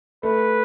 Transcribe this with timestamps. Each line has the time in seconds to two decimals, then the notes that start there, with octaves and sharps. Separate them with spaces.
0.23 A3 B4